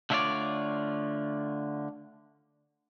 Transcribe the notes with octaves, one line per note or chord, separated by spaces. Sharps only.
D3 A3 E4 F4 C#5 D5